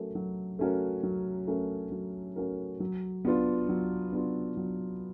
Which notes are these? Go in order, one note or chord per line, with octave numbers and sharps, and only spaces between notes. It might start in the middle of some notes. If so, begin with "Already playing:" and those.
Already playing: F#3 A3 C#4 F#4 A#4
F#3
A3 C#4 F#4 A#4
F#3
A3 C#4 F#4 A#4
F#3
A3 C#4 F#4 A#4
F#3
B3 D4 F4
F#3
B3 D4 F4
F#3